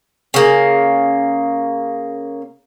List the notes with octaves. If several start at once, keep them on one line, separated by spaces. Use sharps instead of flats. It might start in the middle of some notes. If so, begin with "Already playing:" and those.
C#3 A#3